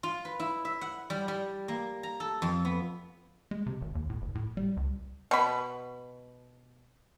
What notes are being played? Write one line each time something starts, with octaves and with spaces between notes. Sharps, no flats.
F4
B4
E4
E5
F#5
G3
G3
A#3
A#5
A4
F2
B3
G#3
C3
G#1
D#2
A2
F#1
A2
G3
C#2
B2 B5